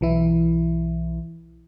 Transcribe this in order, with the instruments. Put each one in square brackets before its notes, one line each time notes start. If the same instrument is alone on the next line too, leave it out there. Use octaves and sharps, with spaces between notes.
[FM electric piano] B1 E3 E4